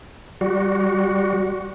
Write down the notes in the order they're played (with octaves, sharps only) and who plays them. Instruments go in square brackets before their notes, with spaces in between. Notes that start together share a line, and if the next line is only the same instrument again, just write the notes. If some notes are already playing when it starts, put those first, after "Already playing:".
[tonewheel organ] G3 F#4